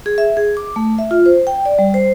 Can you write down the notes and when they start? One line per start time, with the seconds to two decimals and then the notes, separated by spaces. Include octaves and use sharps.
0.06 G#4
0.18 E5
0.37 G#4
0.57 D6
0.76 A3
0.98 E5
1.11 F4
1.26 C5
1.47 G5
1.65 D5
1.79 G3
1.94 C5